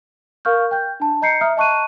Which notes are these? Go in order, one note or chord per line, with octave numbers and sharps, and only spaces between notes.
A#4 F5 C#6 F6 G6
G5 G6
D4 A5
D#5 A#5 G6 C7 C#7
E5 A#5 D#6 F6
D#5 A5 C#6 F#6 D#7